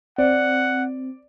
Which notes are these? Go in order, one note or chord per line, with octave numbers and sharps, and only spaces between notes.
C4 D5 F#5